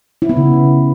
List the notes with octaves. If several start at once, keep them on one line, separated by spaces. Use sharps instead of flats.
E4
B3
C#3